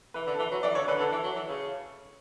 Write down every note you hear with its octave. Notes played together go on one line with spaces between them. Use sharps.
E3 B4
D3
A4
E3 B4
F#3
E3 D5
D3 C#5
D3 B4
D3 A4
E3
F#3
E3
C#3